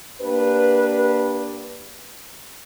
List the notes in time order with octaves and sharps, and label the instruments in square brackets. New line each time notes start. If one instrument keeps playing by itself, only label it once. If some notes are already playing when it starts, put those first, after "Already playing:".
[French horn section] A#3 D4 G4 B4